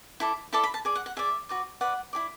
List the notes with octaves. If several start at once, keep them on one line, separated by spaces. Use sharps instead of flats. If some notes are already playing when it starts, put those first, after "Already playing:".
E4 A4 D5
E4 A4 D5 A5
B5
A5
G#4 D5
F#5
F#5
G#4 D5 E5
F#4 B4 D5
F#4 B4 D5 F#5
E4 G#4 D5